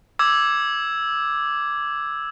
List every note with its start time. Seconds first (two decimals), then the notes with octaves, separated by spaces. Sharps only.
0.19 D6 E6 G#6